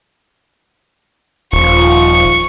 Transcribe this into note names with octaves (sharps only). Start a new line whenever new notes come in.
D#1 F3 F4 C#6